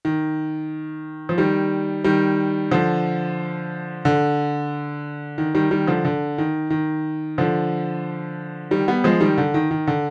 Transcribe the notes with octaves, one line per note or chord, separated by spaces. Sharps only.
D#3
F3
D#3 G3
D#3 G3
D3 F3
D3
D#3
D#3 G3
D#3 G3
D3 F3
D3
D#3
D#3
D3 F3
D#3 G3
G3 B3
F3 G#3
D#3 G3
D3
D#3
D#3
D3